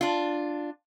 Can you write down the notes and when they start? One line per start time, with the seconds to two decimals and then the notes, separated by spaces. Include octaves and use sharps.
0.01 D4 F4